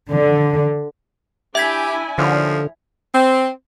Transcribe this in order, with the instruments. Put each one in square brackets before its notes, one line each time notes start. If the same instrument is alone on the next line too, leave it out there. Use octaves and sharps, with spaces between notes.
[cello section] D3
[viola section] D4 E4 G#5 [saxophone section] G4 [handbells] E5 G#6 B6
[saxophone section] D#2 A2 F3 [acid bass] D3
[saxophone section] C4